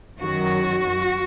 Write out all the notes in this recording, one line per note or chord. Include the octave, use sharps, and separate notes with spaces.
F#2 D#3 F#3 F#4